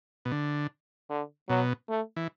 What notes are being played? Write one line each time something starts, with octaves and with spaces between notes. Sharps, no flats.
B2
D3
D3
B2 F#3
A3
E3